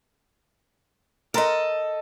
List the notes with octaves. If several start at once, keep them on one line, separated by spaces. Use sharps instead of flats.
A4 A#4 D#5 A#5 C6